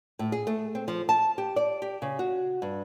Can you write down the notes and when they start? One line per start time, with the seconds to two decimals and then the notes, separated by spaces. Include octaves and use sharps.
0.19 A2
0.32 G#4
0.47 A3
0.75 C4
0.88 F3
1.09 A5
1.38 G4
1.56 D5
1.82 G4
2.02 C#3
2.19 F#4
2.62 G2